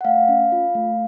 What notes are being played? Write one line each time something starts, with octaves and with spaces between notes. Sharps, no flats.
F#5
A3 F5
C#4
F4
A3